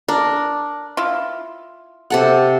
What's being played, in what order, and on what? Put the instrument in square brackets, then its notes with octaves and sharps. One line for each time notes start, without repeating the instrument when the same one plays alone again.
[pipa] D4 [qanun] A#4
[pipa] E4 F4
[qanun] C3 A4 F#5